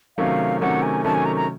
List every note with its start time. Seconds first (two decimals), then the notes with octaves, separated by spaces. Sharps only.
0.18 C3 D#3 F#3 A3 C#4 F5
0.61 C3 D#3 F#3 A3 C#4 F#5
0.83 G#5
1.04 C3 D#3 F#3 A3 C#4 A5
1.15 G#5
1.25 A#5
1.36 A#5